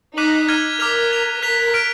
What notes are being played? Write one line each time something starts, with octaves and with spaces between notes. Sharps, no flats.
D#4 D6 F#6 B6 D#7 F#7
F6 G#6 D#7 F#7
A#4 D6 F6 B6 F7
G#6 B6 F7
A#4 F#6 B6 F7
F6 B6 D7